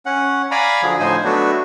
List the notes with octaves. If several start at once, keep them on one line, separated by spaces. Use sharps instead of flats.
C#4 F#5
D5 F5 G#5 A#5 B5
D3 F3 F#3 G#4
A2 D3 F3 D#4 C5 G#5
F#3 A3 B3 D4 F#4